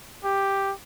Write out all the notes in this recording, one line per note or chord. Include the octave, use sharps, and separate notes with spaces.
G4